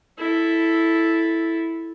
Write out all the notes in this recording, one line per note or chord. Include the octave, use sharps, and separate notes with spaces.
E4 A4